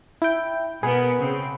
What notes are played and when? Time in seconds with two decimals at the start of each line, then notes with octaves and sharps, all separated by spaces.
0.22 E4 G5
0.83 B2 B3 G#4 A#4 B4 F#5
1.19 C#3 C4